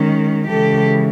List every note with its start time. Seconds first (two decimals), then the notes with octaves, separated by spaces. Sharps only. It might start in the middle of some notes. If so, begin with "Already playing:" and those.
Already playing: D#3 G#3 C#4
0.48 C#3 E3 G#3 G4 A4